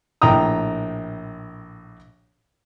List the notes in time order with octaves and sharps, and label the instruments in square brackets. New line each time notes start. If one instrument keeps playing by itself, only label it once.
[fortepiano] A#1 A2 G5 A#5 D#6